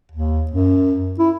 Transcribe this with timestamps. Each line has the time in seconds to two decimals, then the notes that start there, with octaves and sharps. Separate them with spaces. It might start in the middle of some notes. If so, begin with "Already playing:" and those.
0.12 D#2
0.51 F#2
1.19 E4